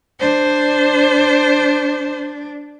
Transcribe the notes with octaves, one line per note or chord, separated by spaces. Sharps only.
D4 C5